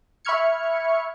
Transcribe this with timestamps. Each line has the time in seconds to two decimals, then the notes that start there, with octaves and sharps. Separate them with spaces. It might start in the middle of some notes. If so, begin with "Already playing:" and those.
0.25 E5 B5 C#6 F6 G#6 C#7